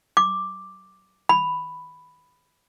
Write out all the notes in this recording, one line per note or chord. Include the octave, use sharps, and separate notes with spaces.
D6
B5